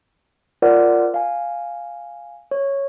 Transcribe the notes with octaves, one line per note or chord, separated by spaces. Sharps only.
F4 A#4 C5 D5 F#5
F5 G#5
C#5